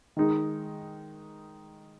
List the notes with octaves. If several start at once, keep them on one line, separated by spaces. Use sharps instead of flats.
D#3 G#3 D#4